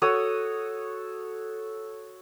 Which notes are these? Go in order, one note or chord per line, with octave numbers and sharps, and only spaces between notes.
F#4 A4 C#5 D#6